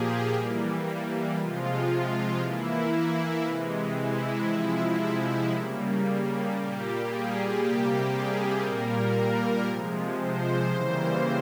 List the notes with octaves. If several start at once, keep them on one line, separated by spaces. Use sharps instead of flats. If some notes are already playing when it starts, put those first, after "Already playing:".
Already playing: A#2 F3 A#3 G4 G#4
E3 G3 A#3
C3 F3 G#3 F4
E3 A#3 E4
C3 E3 G#3
E4
C3 F3 G#3 E4
C#3 G3 A#3
A#2 G3 A#3 G4
G#4
C3 G3 A#3 G4
G#4
A#2 G3 A#3 A#4
A#4
C3 F3 G#3
C5
C#3 E3 G3 A#3 C5